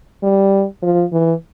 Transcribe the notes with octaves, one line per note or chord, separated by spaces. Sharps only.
G3
F3
E3